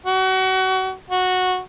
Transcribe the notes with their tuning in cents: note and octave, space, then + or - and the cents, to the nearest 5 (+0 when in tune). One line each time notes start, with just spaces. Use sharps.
F#4 +30
F#4 -10